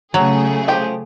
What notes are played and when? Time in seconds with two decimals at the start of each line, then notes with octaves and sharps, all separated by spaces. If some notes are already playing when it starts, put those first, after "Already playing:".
0.14 C#3 F#3 A3 G#4
0.68 F3 G4 G5